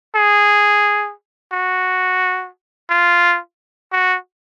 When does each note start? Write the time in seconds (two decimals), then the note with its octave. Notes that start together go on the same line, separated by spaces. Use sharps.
0.15 G#4
1.52 F#4
2.90 F4
3.92 F#4